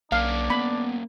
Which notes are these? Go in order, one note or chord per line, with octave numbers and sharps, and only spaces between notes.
B1 A#3 C#4 D4 F5
B3 B5